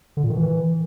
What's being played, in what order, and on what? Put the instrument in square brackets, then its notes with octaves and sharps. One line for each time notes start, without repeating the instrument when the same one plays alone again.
[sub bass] D3
A#2
D#3
E3